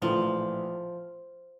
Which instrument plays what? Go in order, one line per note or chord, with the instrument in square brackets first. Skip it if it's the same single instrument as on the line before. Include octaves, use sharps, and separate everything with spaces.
[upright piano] A#1 A2 E3 A3 [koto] F3